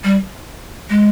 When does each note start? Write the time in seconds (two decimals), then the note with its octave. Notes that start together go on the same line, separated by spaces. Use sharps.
0.04 G3
0.90 G#3